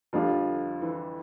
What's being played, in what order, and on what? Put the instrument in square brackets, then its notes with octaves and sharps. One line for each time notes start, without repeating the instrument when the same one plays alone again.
[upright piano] F2 D3 G3 D4 F4 [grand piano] F3
[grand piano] E3